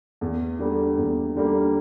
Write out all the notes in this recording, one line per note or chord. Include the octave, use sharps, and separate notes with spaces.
E2
D3 G3 A#3
E2
D3 G3 A#3